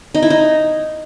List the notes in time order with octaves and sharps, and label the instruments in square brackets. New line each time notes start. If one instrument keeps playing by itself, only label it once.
[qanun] D#4
E4
D#4